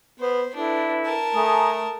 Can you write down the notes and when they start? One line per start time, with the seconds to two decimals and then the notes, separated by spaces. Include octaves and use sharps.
0.20 B3 C5
0.55 D4 E4 A4 B4
1.05 A#4 A5
1.34 A3 G#5 A#5 D#6